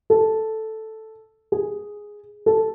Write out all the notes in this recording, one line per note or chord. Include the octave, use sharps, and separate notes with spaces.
A4
G#4
A4